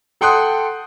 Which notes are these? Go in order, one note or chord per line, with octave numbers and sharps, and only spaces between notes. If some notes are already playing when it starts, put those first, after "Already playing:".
A4 F#5 G5 C6 D#6 F#6